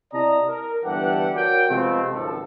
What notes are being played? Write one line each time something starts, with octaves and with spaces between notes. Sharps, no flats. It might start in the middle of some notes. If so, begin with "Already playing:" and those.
C3 E4 D5 D#5 A5 A#5
A#4
G1 G2 E3 G4 A4 F#5
F#4 A#4 C#5 D5 F#5 G5
C3 F3 G#3 A3 B3 C4
G#1 C#2 F#2 F3 A4